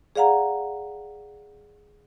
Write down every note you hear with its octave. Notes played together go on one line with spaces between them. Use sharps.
G#4 D5 F5 F#5 A#5